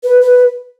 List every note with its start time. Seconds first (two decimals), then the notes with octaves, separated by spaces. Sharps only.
0.03 B4
0.21 B4